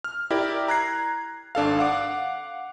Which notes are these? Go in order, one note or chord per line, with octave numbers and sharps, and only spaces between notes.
F6
E4 G4 A#4 D5
A#5 F#6 G#6 C7
G#1 D4 A4 F5
F5 F#5 D6